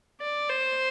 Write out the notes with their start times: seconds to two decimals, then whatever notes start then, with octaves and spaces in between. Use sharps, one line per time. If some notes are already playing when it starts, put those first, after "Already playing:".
0.21 D5
0.49 C5